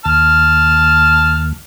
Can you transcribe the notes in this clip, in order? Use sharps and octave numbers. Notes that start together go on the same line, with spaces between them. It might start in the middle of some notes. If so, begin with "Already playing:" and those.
D#2 A5 F6